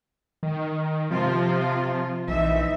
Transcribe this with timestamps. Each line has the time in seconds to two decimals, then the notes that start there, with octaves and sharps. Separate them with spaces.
0.43 D#3
1.11 C3 F3 F4
2.28 A#1 E3 D#4 E5